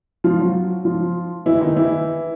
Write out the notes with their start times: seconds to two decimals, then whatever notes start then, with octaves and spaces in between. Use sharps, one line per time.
0.24 F3 F4
0.39 F#3 F#4
0.85 F3 F4
1.46 E3 E4
1.61 D#3 D#4
1.76 E3 E4